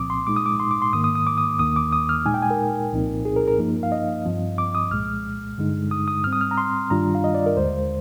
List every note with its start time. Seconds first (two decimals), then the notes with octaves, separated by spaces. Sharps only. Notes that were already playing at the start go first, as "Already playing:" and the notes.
Already playing: C2 A#2 F3 C4 D6 D#6
0.10 C6
0.27 A#2 G#3 D#4 D6
0.36 D#6
0.46 D6
0.60 C6
0.71 D6
0.82 C6
0.93 G#2 D#3 A#3 D#6
1.04 D#6
1.15 D#6
1.27 D6
1.38 D#6
1.59 D#2 D#3 A#3 D#6
1.76 D6
1.92 D#6
2.09 F6
2.26 A#2 G#3 D#4 G#5
2.34 G5
2.42 G#5
2.50 A#4
2.92 C2 A#2 F3 C4 D#4
3.25 G#4
3.36 A#4
3.48 A#4
3.59 G2 F3 A#3 D#4
3.83 F5
3.92 D#5
4.25 G2 F3 C4
4.58 D6
4.75 D#6
4.91 C2 A#2 G#3 F6
5.58 G2 D3 G#3 D#4
5.91 D#6
6.08 D#6
6.24 G#2 G3 C4 F6
6.33 D#6
6.41 F6
6.51 A#5
6.58 C6
6.90 G2 D#3 G3 D4 F4 A#5
7.15 F5
7.24 D#5
7.35 D5
7.46 A#4
7.57 D#2 D3 G#3 C5